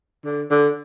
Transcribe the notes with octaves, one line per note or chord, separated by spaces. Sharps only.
D3
D3